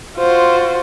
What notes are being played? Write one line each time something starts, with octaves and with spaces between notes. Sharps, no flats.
F4 F#4 C5